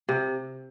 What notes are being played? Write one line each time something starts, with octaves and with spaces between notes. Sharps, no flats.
C3